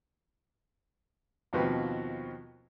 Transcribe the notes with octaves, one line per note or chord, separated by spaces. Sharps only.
D#2 B2 F3 C4 F#4 B4